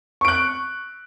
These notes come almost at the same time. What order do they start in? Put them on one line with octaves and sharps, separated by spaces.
C#6 D7 F#6